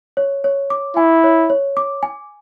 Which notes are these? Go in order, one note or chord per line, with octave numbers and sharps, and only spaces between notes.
C#5
C#5
D6
E4 G#5
C#5
C#5
D6
G#5